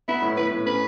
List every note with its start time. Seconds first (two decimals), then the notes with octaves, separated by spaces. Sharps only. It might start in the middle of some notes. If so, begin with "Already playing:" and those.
0.08 B3 E4
0.22 A2
0.37 A2 B4
0.52 A2
0.66 C#4 B4